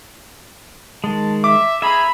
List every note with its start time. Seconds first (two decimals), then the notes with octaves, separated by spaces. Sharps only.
1.04 D#3 G#3 A5
1.44 E5 D6
1.82 G#4 E5 A#5 B5